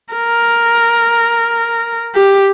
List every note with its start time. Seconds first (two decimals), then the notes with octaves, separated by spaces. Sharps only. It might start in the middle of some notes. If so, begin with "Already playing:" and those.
0.13 A#4
2.15 G4